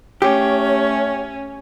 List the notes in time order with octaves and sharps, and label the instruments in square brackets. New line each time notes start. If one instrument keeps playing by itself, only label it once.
[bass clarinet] A3 [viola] C#4 [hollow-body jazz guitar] G4 [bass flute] C#5